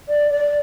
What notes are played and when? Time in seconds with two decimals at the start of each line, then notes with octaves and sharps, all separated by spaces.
0.09 D5
0.31 D5